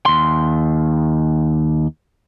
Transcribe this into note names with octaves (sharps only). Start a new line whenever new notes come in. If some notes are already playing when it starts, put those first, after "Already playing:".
D#2 C6